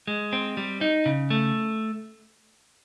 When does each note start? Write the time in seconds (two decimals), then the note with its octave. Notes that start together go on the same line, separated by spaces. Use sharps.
0.08 G#3
0.33 C4
0.57 G3
0.81 D#4
1.06 C#3
1.30 A3